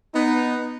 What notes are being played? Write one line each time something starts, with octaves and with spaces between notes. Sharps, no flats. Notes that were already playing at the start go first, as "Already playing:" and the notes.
B3 D#4